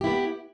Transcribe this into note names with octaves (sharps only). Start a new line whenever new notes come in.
B3 E4 G4